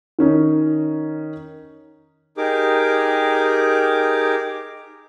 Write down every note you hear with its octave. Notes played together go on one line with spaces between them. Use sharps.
D#3 C#4 D#4
D#4 G4 G#4 A#4 D6